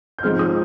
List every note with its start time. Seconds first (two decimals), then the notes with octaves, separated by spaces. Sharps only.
0.18 G6
0.23 G#2 F3 G#3 C4 F4 F6
0.39 D#6